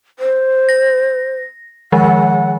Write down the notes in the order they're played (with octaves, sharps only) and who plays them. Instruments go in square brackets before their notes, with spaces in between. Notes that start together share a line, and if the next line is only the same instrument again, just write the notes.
[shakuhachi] C5
[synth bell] A#6
[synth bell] D#3 F3 G#3 [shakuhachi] F#5